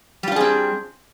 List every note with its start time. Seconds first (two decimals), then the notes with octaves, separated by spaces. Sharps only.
0.23 G3
0.28 F4
0.32 D4
0.36 G#4
0.41 C4